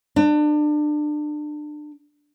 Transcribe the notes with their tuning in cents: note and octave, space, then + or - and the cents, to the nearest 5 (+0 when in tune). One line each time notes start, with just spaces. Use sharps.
D4 +30